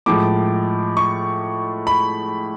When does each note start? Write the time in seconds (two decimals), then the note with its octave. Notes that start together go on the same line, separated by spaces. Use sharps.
0.06 A2 F3 G#3 D6
0.97 C#6
1.87 B5